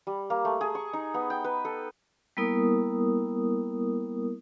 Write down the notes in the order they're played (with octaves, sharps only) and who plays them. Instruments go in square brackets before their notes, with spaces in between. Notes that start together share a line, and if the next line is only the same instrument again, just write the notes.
[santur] G3
A#3
A3
G#4
C#6
D#4
B3
G5
B4
A4
[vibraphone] G3 A#3 B3 E4 A#4 D#6